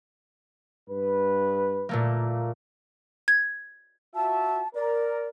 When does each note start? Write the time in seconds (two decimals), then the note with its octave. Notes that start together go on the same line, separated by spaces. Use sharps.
0.90 G2 B4
1.89 A#2 A3 A#3
3.28 G#6
4.15 F4 F#4 E5 A5
4.75 A#4 D5